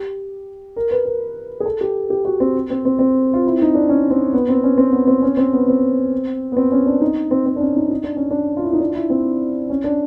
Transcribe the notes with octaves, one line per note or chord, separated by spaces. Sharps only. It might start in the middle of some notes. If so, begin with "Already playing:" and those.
Already playing: G4
A#4
B4
A#4
G#4
A4
G4
G4
F#4
C4
C4
C4
C4
F4
E4
D#4
D4
C#4
C4
B3
C4
C#4
C4
B3
C4
C#4
C4
B3
C4
B3
C4
C#4
D4
D#4
C4
C4
D4
C#4
D#4
D#4
D4
C#4
D4
F4
E4
D#4
D4
F4
E4
C4
C#4
D4